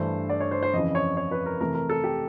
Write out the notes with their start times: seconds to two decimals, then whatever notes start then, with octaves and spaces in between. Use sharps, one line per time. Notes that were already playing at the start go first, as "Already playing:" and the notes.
Already playing: G2 E3 A3 C5
0.29 D5
0.40 C#5
0.51 C5
0.63 C5
0.73 F2 C#3 E3 D#5
0.95 C#5
1.17 C#5
1.31 B4
1.46 A#4
1.61 C3 E3 A3 A#4
1.75 A#4
1.90 A4
2.04 G4